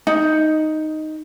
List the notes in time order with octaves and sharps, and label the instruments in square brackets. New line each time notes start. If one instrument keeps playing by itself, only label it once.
[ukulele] D#4